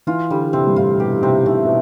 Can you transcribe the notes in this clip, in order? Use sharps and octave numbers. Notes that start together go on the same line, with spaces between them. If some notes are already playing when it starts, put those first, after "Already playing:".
E3 F4
D3 G3
C3 C4
G2
A2 F4
B2 G4
C3 C4
C3 A3
B2